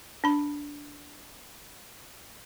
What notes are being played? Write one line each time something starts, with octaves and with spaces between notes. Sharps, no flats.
D4 B5